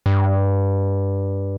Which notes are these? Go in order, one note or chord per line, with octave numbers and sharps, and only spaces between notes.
G2